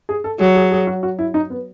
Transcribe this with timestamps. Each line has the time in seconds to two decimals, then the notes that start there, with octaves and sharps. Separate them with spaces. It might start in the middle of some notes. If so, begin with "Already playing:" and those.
0.09 G#4
0.24 A4
0.40 F#3 G#4
0.55 G#4
0.72 G#4
0.87 F#4
1.03 F#4
1.19 E4
1.34 D#4
1.50 B3